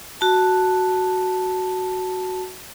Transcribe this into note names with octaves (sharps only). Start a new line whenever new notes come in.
F#4 A5